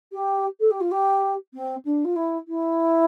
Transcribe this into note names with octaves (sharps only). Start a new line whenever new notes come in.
G4
A4
G4
F4
G4
C4
D4
F4
E4
E4